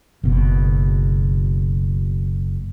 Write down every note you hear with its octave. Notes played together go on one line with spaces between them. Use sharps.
F#1 B2